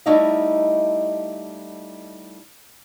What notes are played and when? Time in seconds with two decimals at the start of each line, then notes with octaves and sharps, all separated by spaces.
0.06 G3 A3 D#4 E4 D#5 F5